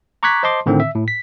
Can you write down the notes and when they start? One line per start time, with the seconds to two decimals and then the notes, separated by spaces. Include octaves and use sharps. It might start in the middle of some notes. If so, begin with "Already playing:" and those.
0.23 A#5 C#6 D6 F#6 G#6 B6
0.43 C5 D#5 A5 C6 D6
0.66 A2 D3 D#3 C4
0.80 E5
0.95 A2
1.08 B6